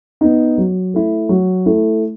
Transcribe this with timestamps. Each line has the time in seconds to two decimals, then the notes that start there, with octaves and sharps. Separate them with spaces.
0.21 B3 D#4
0.58 F#3
0.94 A3 E4
1.29 F#3
1.66 A3 E4